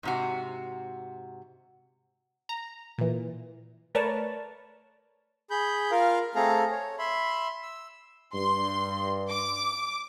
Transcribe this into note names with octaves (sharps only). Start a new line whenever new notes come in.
G#2 C3 F#4
A#5
A#2 E3
A3 A#4 B4 C#5 D5 A5
G#4 B5 G6
F4 A#4 F5
A3 C4 G#4 A4 F5 A#5
C#5
E5 B5 C6
E6
G2 C6
D6